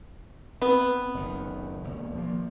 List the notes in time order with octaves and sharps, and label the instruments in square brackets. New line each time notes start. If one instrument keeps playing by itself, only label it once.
[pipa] B3 [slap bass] C4
[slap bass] F#1 D#3
E1 D#2
F3 A#3